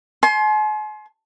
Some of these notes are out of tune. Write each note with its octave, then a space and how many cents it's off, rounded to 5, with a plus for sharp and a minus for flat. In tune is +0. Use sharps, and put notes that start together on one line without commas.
G#5 +45 C6 +15